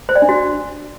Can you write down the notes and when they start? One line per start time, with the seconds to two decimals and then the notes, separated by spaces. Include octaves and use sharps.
0.09 C5
0.15 D5
0.22 D4
0.29 F#4